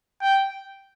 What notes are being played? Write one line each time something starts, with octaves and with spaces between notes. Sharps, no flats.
G5